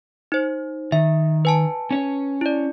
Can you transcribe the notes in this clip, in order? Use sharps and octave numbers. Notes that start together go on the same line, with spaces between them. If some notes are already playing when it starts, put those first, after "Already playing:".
D#4 C5
D#3 E5
B4 G#5 A5
C#4 C#5
E4 D5